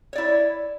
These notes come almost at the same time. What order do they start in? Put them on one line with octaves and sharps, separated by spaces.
C#5 D5 E4